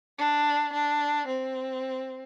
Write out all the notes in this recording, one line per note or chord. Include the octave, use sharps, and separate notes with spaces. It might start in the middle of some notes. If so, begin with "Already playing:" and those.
D4
D4
C4